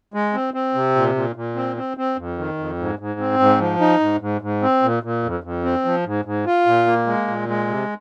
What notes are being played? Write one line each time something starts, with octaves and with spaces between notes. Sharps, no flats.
G#3
C4
C4
C3
A#2
A#2
A#2
C4
C4
C4
F2
D#3
F2
G#2
G#2
C4
G#2
F3
D#4
G#2
G#2
G#2
C4
A#2
A#2
F2
F2
C4
F3
G#2
G#2
F4
A#2
A#3
G#3
A#2
G#3
C3